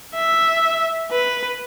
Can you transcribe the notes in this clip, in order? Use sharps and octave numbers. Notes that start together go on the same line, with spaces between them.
E5
B4